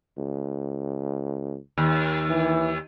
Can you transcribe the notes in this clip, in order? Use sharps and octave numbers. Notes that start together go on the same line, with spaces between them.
C#2
D#2
E3